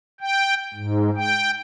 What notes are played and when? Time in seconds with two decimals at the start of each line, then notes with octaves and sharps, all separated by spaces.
0.21 G5
0.74 G#2
1.16 G5